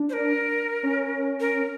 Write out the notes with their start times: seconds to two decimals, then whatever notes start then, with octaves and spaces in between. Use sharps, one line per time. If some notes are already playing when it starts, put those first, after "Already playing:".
Already playing: D4
0.09 C5
0.13 A#4
0.83 C#4
1.40 A#4